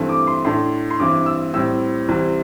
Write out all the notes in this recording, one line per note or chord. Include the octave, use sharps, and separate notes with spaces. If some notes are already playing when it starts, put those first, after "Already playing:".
Already playing: G2 E3 A3 C4
D6
C6
A2 A3 D4 C6
C6
G2 E3 C4 D6
E6
A2 G3 C4 E6
C2 C3 E3 C4